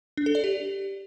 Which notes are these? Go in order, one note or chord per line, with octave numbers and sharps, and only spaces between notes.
D4
A4
D5
G4